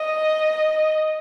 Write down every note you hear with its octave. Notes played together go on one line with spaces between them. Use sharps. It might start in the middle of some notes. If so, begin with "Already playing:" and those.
Already playing: D#5